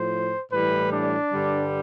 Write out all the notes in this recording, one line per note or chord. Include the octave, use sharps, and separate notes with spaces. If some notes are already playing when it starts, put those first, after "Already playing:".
Already playing: A2 F3 C5
A2 E3 G3 B4
D4
G2 D3 G3